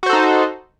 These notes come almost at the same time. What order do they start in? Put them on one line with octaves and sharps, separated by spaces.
F#4 C5 A4 D#4